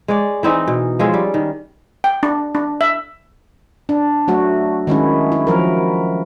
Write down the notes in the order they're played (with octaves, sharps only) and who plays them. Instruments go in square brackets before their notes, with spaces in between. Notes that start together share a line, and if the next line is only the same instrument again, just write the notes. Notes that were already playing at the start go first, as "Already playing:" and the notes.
[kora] G#3 C#5 D5
E3 C4 D#4 D#5
B2
F3 G#3 C#4 A4
G3
D#3
[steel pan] G5
D4
D4
E5
[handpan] D4
F#3 A3 F#4
D#3 G#3 C#4 E4
E4
F3 F#3 A#4